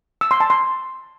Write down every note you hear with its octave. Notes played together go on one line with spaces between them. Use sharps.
E6
C6
A5
C6